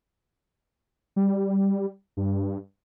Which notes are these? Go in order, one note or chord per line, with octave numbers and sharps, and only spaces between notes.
G3
G2